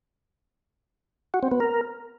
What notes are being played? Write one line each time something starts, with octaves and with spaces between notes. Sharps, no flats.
F#4
C4
B3
A#4